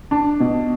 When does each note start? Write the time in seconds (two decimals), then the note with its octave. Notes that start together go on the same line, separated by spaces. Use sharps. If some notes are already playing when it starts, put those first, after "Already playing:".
0.11 D4
0.40 B2